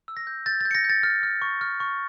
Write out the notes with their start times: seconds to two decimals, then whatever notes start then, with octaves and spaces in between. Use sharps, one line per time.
0.08 E6
0.17 A#6
0.27 G6
0.46 G6 A6
0.61 G6 A6
0.71 C#7
0.75 A#6
0.84 G6
0.89 A6
1.03 F6 A6
1.23 F6
1.42 C#6
1.61 F6
1.80 C#6